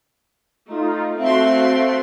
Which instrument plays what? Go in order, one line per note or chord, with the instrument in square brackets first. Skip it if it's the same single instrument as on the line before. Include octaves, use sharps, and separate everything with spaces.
[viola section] A3 [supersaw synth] D#4 F4
[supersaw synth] A3 [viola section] C4 F#4 C6 [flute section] E5 F5